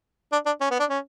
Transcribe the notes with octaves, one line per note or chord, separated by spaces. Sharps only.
D4
D4
C#4
B3
D4
C#4